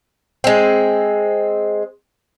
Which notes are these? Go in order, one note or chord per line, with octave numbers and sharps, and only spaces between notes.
G#3 C4